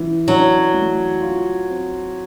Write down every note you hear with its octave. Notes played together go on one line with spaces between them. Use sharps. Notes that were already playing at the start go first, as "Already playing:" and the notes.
Already playing: E3
F#3 D4
A3
F4
C4